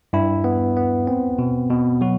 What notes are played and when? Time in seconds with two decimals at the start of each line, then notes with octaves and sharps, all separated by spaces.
0.13 G2 E4
0.44 B3
0.77 B3
1.07 C4
1.39 B2
1.70 B2
2.01 F#3 F#4